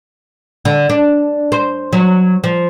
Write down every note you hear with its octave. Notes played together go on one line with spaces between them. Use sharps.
D3
D4
C5
F#3
F3